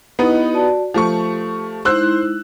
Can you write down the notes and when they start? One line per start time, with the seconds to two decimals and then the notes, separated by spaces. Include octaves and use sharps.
0.19 B3 D#4 E4 G4 B4 D#5
0.53 F#4 D5 A5
0.94 F3 A3 G4 C#6
1.85 G#3 D#4 E4 C5 E6 F#6